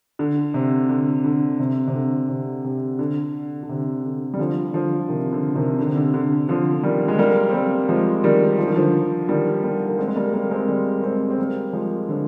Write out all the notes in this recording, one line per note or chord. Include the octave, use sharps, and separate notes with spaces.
D3
C3
D3
D3
C3
C3
D3
C3
C3
D3
D3
C3
D3
G3
D3 F3
D3 F3
C3 D#3
D3
C3 D#3
D3
C3
D3
D3
D3 F3
D#3 G3
G#3
G3 A#3
C4
G3 A#3
F3 G#3
D#3 G3
F3
D#3
D3 F3
D#3 G3
G3 A#3
A#3
G#3 C4
G#3
G3 A#3
G3 A#3
G#3 C4
G3 A#3
G#3 C4
C4
G3 A#3
F3 G#3
D3 F3